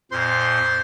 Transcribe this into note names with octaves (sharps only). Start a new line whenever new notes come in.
F2 A#2 C5 C6